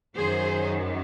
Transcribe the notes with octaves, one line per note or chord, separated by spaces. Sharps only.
F#2 D#3 F#3 G#4 C5